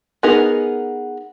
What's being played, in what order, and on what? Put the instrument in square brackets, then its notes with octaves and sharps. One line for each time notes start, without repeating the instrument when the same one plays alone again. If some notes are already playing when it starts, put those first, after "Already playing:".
[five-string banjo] B3 D#4 G#4 A#4